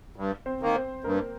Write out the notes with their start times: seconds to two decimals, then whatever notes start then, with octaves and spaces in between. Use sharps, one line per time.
0.16 G2
0.46 C4 C5
0.60 D#3 A#3
0.75 C4 C5
1.04 G2 A#3 A#4